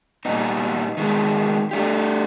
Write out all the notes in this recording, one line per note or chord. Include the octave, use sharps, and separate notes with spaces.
A#2 G3 B3 D#4
D#3 G#3 B3
A3 D4 G4